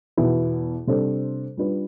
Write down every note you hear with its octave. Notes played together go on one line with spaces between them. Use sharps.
E2 B2 B3 E4
C3 G3 D4 A4 C5
G3 D4 F4 B4